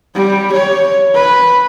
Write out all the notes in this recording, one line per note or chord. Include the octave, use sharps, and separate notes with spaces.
G3
C#5
B4